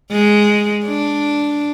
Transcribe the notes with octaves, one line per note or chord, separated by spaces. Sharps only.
G#3
D4